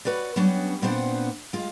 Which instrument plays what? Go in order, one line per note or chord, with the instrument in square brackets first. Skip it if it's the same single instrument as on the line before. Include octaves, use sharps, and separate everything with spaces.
[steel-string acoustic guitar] F#4 B4 C#5 D5
F#3 G3 B3 C#4 D4
A#2 B3 C4 D4 C5 F#5
G#3 F4